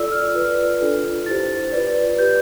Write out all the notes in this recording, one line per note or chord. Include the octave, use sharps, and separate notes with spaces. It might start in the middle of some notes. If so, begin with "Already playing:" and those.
Already playing: F4 A4 D5 E6
F6
F4 B4 D5
D4 F4 A4
E4 G4 C5 A6
F4 B4 D5
G4 B4 D5 G6